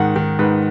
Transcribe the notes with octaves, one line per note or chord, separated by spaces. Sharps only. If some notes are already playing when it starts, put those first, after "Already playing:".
Already playing: G#2 D#3 F#5
D#3
G#2 B4